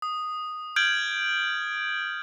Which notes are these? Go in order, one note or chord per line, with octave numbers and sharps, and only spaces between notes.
D#6
F6 G6 G#6 D7 F#7